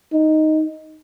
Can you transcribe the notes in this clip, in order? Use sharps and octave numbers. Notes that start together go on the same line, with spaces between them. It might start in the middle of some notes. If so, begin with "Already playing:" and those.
D#4